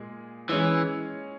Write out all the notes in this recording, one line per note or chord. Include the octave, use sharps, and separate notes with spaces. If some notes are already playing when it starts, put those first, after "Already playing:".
Already playing: A#2 G#3 G#4
E3 G#3 C#4 G#4